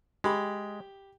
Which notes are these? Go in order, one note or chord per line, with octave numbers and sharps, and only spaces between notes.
G#3 G4 B5